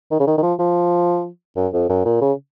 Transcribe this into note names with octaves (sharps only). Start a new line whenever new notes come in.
D#3
C#3
D#3
D#3
F3
F3
F#2
F2
F#2
A#2
C#3